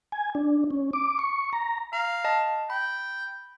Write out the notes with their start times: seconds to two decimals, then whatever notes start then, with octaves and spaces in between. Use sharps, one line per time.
0.12 G#5
0.35 D4
0.71 C#4
0.93 D6
1.19 C#6
1.53 A#5
1.93 F5 A#5
2.24 D#5 A5
2.70 G5 B5